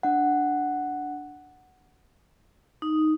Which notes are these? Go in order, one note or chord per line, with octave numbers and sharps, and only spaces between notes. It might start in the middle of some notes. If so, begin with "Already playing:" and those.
D4 F#5
D#4